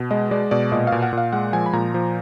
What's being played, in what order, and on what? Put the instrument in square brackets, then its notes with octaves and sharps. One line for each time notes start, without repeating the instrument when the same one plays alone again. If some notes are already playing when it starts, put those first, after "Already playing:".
Already playing: [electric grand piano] B2
G#3 D#5
G#3 D5
B2 D5
A#2 D#5
A#2 F5
F#5
A#2 F5
G#3 F#5
F3 G#5
B5
A#2 A#5
F3